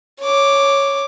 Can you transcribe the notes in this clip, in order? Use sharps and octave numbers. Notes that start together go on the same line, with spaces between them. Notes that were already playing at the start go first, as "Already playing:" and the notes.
C#5 D6